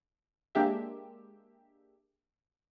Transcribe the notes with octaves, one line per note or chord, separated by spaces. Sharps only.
G#3 A#3 D4 G4 E5